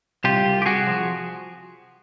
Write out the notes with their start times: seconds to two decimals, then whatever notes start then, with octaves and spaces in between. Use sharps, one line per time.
0.24 C2 F4 G4
0.45 C2
0.62 G4
0.66 C2 F#4 G#4
0.87 F3